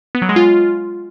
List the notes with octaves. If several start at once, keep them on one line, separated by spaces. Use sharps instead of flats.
B3
F#3
G#3
F4